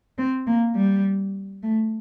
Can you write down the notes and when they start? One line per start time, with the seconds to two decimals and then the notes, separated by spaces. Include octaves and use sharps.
0.18 C4
0.47 A#3
0.76 G3
1.63 A3